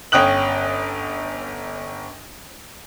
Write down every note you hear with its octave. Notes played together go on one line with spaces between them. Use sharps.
G1 C#4 G5 D#6 F#6 F#7